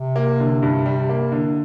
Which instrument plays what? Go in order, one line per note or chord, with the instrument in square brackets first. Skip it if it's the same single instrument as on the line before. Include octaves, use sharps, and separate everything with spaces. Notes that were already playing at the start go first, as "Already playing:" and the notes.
Already playing: [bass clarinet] C3
[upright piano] A#3
D3
G2
G3
A#3
D3